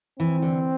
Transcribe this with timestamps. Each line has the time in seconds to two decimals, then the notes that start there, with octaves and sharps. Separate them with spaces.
0.19 E3 C4
0.42 D3